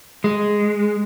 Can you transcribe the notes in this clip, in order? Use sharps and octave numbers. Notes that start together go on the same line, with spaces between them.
G#3